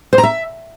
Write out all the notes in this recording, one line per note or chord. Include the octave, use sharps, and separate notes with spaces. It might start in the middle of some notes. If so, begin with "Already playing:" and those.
C5
A#5
E5